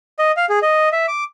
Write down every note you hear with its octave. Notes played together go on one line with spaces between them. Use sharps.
D#5
F5
G#4
D#5
E5
D6